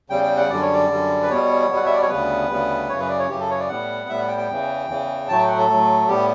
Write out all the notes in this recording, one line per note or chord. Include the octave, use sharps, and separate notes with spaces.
E2 C#3 G3 G5
G5
F#5
F#2 D3 G3 D5
C#5
D5
F#2 D3 G3
B4
E2 B2 G3 B3 C#5
E2 B2 G3 B3
F#5
E5
D5
C#5
D2 C#3 G3 B3 B4
D2 C#3 G3 B3
F#2 C#3 E3 C#5
B4
D5
C#5
F#2 C#3 E3 G4
A4
C#5
D5
A2 G3 B3 F#5
A2 G3 B3 E5
F#5
G5
G5
E2 C#3 E3
E2 C#3 E3
A2 F#3 A3 A5
G5
F#5
A4
A2 F#3 A3
A2 G3 B3 G4